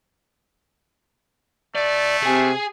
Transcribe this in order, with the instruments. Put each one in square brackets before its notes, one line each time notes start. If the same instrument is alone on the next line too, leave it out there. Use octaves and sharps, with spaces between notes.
[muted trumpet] A3 [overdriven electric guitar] D5
[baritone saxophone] C3 [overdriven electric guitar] G#4 G#5